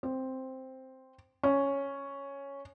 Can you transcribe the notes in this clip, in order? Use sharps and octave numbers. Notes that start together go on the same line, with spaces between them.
C4
C#4